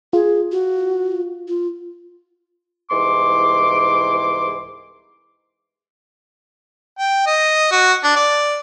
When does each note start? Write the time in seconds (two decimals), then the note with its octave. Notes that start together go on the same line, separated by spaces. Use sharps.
0.13 F4 G#4
0.52 F#4
1.48 F4
2.91 C2 G#2 E3 C6 D6
6.99 G5
7.26 D#5
7.72 F#4
8.04 D4
8.16 D5